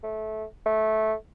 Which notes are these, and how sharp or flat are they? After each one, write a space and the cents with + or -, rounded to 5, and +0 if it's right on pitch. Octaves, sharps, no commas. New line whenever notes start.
A3 -20
A3 -15